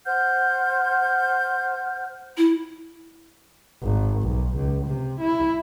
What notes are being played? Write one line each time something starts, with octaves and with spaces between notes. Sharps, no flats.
C5 F#5 F6 G6
E4
G#1
B1
C#2
C3
E4